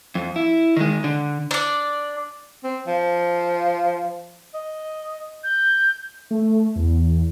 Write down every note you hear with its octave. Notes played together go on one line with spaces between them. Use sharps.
F2
E4
D#3 G#3
D3
D4 D5
C4
F3
D#5
G6
A3
E2